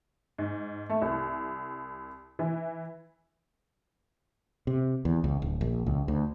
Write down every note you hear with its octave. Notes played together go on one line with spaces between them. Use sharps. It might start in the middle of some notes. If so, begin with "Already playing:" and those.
G#2
A3
C2
E3
C3
E2
C#2
D1
A#1
C#2
D2